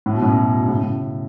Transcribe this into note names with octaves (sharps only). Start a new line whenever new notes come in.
A2
B2
F#2 A2
A2 C#3
A2 C#3